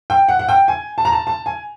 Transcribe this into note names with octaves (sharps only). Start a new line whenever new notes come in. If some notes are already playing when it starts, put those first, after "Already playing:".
G5
F#5
F#5
G5
G#5
A5
A#5
A5
A5
G#5